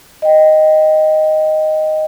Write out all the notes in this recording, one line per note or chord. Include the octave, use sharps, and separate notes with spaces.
D#5 G5